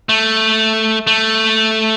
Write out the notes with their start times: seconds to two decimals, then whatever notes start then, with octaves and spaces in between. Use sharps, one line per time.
0.09 A3
1.07 A3